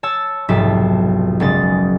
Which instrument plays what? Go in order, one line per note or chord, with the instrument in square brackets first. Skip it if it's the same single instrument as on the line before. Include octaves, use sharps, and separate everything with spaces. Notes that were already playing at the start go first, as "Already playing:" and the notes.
[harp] C#5 A5 E6
F1 B1 G#2 A5 B6
F#1 G#3 C#4 A6